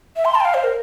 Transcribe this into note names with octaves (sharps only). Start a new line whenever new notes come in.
E5
C6
A5
G5
F5
C5
A#4